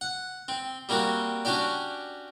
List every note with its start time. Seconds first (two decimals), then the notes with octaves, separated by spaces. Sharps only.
0.01 F#5
0.48 C4
0.89 G3 A#3 C4 F#4
1.45 C#4 D4 F#4 G4 D5